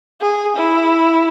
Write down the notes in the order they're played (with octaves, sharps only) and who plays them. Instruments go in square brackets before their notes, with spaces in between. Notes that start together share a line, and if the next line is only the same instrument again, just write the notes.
[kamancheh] G#4
E4